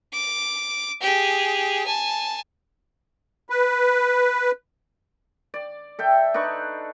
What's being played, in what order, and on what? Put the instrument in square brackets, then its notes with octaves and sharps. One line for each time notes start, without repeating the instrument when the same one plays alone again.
[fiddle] D6
G4 G#4
G#5 A5
[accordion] B4
[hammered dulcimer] D5
A4 E5 G5
D4 D#4 B4 C#6